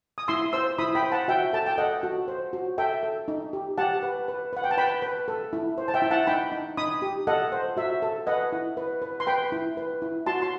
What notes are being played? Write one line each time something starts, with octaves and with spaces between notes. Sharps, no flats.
D#6
E4 C6 E6
C5 C6 E6
E4 B5 D#6
G5 B5
C5
F#5 A5
F#4 E5 G5
A4 A5
G5
A4 D#5 F#5
F#4
C5
F#4
A4 E5 G5
A4
D#4
G4
G4 F#5 A5
B4
B4
B4 F#5
G5
A5
B4 G5 B5
B4
A4
E4
C5
A5
E5 G5
E4
F#5 A5
D#4 G5 B5
D#4
D#4 B5 D#6
G4
A4 D#5 F#5
C5
F#4 E5
A4
B4 D#5 F#5
E4
B4
B4
C6
B4 G5 B5
E4
B4
E4
F#4 A5 C6
C6